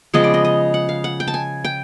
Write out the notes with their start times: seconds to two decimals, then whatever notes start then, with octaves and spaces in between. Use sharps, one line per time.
0.14 C#3 F3 G#3 B3 D#5
0.24 D5
0.34 D#5
0.45 D#5
0.74 F#5
0.89 F5
1.04 F#5
1.20 G5
1.28 A5
1.34 G#5
1.65 G5